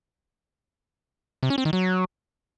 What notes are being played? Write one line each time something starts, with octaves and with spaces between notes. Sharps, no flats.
C3
C#4
C4
D#3
F#3